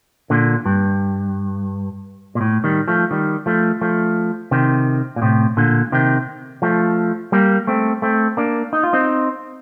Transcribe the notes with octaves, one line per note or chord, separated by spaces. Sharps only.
A#2 D3
G2
A#2
A2
D#3 G3
F3 A3
D#3 G3
F3 A3
F3 A3
C3 D#3
A#2
A2 C3
A#2 D3
C3 D#3
F3 A3
G3 A#3
A3 C4
A3 C4
A#3 D4
D#4
F4
C4 D#4